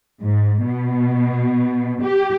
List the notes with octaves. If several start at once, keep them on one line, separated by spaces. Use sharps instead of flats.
G#2
B2
G4